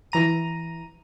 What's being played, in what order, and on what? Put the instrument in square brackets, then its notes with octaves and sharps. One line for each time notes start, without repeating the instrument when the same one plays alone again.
[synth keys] E3 A#5 D#7